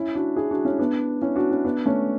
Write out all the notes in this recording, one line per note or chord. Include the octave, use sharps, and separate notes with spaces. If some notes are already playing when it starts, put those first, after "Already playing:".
Already playing: C#4 E4
D4 F#4
E4 G#4
D4 F#4
C#4 E4
B3 D4
C#4 E4
D4 F#4
C#4 E4
B3 D4
A3 C#4